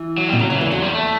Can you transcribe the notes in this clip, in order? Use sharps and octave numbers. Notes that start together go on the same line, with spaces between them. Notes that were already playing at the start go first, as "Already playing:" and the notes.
Already playing: E3
F#3
G3
B2
C#3 F#3
C#3 F#3
E3
E2
E2 F#3
G3
A3